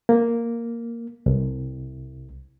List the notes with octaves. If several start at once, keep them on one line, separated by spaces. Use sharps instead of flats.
A#3
C2